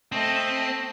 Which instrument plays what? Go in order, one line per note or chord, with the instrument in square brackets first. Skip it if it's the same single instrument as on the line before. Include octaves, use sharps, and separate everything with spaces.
[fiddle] A3 D#5 [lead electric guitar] C4